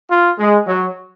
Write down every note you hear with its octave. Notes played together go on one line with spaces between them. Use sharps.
F4
G#3
F#3